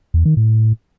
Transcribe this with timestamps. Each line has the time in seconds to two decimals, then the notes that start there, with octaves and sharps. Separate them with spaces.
0.14 E2
0.25 D#3
0.37 A2